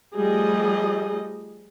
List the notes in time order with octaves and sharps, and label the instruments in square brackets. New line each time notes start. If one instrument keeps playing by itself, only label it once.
[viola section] F3 G3 A3 G#4 D#5